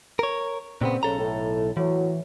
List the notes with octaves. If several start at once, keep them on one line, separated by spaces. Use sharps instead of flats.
A#4 C#5
A#2 C#3 B3 C4
B1 C#3 A4 A#5
A2
A2 E3 F#3